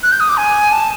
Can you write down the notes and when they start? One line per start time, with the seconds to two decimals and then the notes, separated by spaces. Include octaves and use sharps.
0.03 F#6
0.12 G6
0.20 D#6
0.29 D6
0.37 G#5
0.72 A5